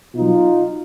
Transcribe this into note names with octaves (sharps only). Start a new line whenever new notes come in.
B2 F#3 D#4 F4